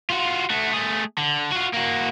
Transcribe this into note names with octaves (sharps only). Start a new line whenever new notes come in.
F4 F#4
A3 F#4
A3 G#4
D3
F4 F#4
A#3 F#4